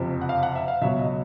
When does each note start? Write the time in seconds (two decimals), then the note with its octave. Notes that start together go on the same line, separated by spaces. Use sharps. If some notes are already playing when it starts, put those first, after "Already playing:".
Already playing: F#1 F2 C3 F3
0.21 F#5
0.29 F5
0.43 F#5
0.55 E5
0.68 F5
0.82 C#2 B2 F#3 E5
0.99 D#5